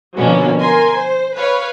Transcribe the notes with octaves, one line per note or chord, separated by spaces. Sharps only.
B2 D3 F3 F#3 A#3 C#4
A#4 G#5 C6
C5
B4 C#5 F5